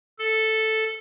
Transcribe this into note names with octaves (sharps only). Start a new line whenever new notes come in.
A4